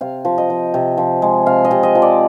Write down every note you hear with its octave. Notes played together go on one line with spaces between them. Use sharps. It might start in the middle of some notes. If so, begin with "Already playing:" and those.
C3 F5
F3
D#5
F3
C3
F3
G#3
C3 F5
D#5
C3
D#5
F3
D5